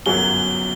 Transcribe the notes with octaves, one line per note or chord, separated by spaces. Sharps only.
G1 F#2 F#3 G7